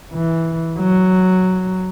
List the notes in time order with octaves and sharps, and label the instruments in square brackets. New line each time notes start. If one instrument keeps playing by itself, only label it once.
[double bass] E3
F#3